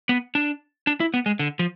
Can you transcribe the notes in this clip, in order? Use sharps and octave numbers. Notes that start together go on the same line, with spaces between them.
B3
D4
D4
E4
B3
G#3
D3
F3